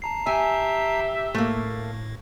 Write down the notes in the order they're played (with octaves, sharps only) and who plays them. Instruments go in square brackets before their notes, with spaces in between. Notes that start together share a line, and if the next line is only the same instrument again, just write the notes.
[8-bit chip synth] A5 A#5 C7
[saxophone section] G4 E5 [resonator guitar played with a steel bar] G#5
[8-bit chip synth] A2 [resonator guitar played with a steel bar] A3 A#3